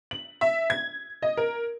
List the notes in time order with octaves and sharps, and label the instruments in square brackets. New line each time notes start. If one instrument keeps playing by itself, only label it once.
[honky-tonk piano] F#7
E5
G#6
D#5
A#4